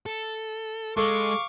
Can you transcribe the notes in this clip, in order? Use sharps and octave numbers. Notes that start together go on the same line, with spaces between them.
A4
G#3 A4 F5 C#6 D6